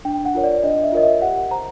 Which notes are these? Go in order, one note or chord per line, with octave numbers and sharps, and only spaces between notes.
D4 G5
F#5
F4 A#4 C#5
D5
D4 D#5
E5
F4 A#4 C#5 D#5
E5
G4 F#5
C5 A#5